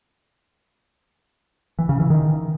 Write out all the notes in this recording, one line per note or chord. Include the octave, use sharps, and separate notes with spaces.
E3
C#3
E3
D#3